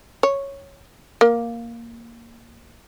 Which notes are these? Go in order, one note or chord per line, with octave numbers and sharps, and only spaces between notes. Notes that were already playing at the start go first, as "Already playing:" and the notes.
C#5
A#3